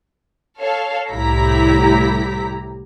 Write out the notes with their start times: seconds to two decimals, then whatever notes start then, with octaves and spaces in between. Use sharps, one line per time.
0.59 A4 C#5 F5
1.10 C2 A2 E4 G4 A#5 B6